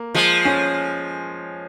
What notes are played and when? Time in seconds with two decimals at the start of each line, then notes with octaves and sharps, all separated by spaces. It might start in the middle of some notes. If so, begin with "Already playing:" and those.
Already playing: A#3
0.15 F3 G#3
0.45 C#4